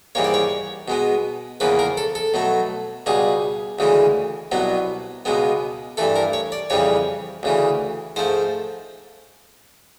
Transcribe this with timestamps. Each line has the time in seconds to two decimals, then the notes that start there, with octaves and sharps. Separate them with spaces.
0.15 G#2 E3 G3 A#3 C#5
0.24 D5
0.34 C#5
0.88 B2 G#3 B3
1.60 E2 C#3 F3 A#3 B4
1.79 A#4
1.97 A4
2.15 A4
2.34 B2 F#3 A3
3.06 C#2 B2 G3 G#4
3.79 D2 C#3 E3 G#3
4.52 C2 B2 F#3 B3
5.25 C#2 B2 G#3 B3
5.97 G2 E3 A3 A4
6.16 A#4
6.33 C#5
6.52 D5
6.70 F2 C#3 E3 G3 C#5
7.43 D2 C#3 E3
8.16 G#2 F3 A3 C5